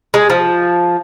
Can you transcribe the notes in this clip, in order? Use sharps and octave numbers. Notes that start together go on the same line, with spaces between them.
G#3
F3